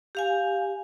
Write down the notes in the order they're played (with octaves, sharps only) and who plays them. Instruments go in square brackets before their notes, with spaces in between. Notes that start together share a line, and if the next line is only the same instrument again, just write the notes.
[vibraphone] G4 F5 G#5